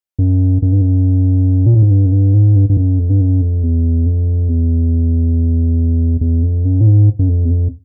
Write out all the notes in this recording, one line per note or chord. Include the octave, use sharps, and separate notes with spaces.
F#2
F#2
G2
F#2
A#2
A2
G#2
G2
F#2
G2
G#2
G2
G2
F#2
F2
G2
F#2
F2
E2
F2
E2
E2
F2
F#2
A2
G#2
F#2
F2
E2
F2